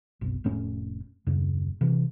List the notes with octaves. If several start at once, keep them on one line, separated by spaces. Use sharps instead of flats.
F#1 B1
F1 A2 A3 C#4
D#1 F#2 C#3
C3 E3